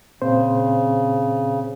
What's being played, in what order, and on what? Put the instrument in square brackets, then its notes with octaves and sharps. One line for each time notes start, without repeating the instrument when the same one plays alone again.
[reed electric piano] A#2 C4 C5 [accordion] C#3